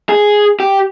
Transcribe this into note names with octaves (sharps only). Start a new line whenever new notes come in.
G#4
G4